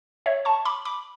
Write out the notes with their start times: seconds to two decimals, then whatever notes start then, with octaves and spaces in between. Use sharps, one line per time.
0.26 C#5 E5
0.45 A5 C#6
0.65 B5 D6
0.85 B5 D6